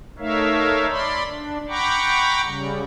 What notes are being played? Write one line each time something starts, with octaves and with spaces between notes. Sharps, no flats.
A3 D#4 A#4 C#5 E5 F5
D5 B5 C6
D4
F#5 G5 A#5 B5 C#6 D6
C#3 G3